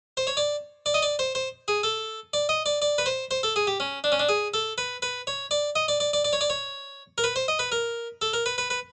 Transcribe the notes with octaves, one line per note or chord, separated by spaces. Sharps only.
C5
C#5
D5
D5
D#5
D5
C5
C5
G#4
A4
D5
D#5
D5
D5
B4
C5
C5
A4
G#4
G4
C#4
D4
C#4
D4
G#4
A4
B4
B4
C#5
D5
D#5
D5
D5
D5
D5
C#5
D5
C#5
A#4
B4
C5
D#5
B4
A#4
A4
A#4
B4
B4
B4